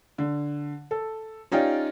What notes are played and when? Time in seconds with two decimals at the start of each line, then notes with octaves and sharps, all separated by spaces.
0.18 D3
0.91 A4
1.52 C#4 D#4 F4 G4 D5